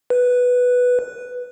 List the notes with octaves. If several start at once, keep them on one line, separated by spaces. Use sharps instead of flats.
B4